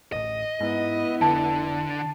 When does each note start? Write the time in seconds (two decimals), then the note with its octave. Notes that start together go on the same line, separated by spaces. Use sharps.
0.12 D1 A1 D#5
0.61 G#2 B3 E4
1.21 F1 D3 A5